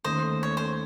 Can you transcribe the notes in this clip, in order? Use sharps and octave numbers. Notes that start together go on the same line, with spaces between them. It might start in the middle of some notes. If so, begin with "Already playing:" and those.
D#2 D#3 A3 C#4 C5 D#5
C#5
C5